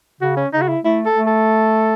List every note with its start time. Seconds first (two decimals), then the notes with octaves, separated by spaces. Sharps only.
0.21 C#3 F#4
0.37 C#4
0.53 C#3 D#4
0.61 F#4
0.68 E4
0.84 A3 E4
1.06 A4
1.16 A3
1.27 A4